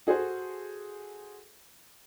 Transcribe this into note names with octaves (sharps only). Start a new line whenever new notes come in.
F#4 G#4 A4 C5